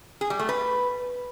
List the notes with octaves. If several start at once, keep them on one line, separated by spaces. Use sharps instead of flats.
G#4
G3
A3
B4